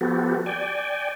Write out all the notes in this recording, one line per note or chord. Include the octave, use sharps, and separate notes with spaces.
F3 B3 F#4 G4 A4
D5 G5 G#5